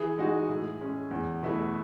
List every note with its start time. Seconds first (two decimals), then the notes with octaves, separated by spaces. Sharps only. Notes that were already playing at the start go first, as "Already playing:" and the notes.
Already playing: E3 G#4
0.18 G#3 D#4 F#4
0.49 A2
0.80 G#3 C#4
1.11 E2
1.43 B2 A3 E4